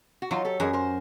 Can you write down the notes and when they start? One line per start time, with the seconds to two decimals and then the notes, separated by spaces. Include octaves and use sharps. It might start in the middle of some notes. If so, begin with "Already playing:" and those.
0.22 F#4
0.31 F#3 D#4 F4
0.45 G4 A4
0.60 F#2 G#4 A#4
0.73 A#4 C5